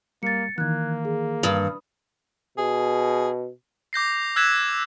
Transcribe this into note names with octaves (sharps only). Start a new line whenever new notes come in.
G3 A#3 A6 C#7
D#3 E3 A#3 F#6 G#6
G#4
G2 D#6
B2 G#4
D6 G6 A#6 C7
E6 F#6 G#6 B6 E7